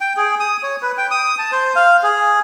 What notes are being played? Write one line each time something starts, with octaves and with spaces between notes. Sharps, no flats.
G5
G#4
D#6
C#5
B4
G5
D#6
A5
C5
F5
G#4